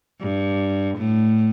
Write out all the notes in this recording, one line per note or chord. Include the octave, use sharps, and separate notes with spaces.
G2
A2